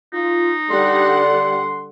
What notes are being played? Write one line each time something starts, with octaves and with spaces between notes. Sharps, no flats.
D#4 F4
D3 G3 G4 D5 F#5 C6